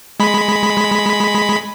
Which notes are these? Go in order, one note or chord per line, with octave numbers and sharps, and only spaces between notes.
G#3 B5